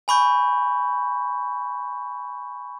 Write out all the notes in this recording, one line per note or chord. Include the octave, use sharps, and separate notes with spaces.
G#5 B5 C#6 G6